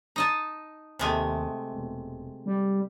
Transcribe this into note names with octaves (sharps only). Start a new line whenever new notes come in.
D#4 D#5 A5
D#2 C3 G#3 A3
E1
G3